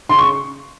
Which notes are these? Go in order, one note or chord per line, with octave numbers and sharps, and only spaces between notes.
C#3 C6
C#6